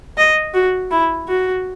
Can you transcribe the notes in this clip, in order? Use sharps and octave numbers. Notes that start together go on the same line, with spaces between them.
D#5
F#4
E4
F#4